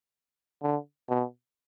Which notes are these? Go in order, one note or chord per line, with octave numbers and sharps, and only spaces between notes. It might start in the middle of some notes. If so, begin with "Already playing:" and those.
D3
B2